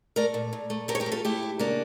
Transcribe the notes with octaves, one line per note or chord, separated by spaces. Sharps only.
A3 A#4 D5
A#2
A#2
A3
A3 G4 A#4
C#5
G4 A#4
A3
F4 A4
A3 E4 G4
A3
C#3 A#3 D4